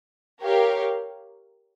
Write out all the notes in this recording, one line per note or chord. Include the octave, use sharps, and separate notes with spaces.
G4 A#4 C#5 F5